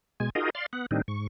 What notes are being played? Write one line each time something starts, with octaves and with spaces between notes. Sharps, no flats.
B2 G#3 G#5
D#4 F4 F#4 G#4 A#4 D#5
D5 F5 C6
B3 F#5
A2 D#3 G3 C4 D4 D#4
G#2 C#6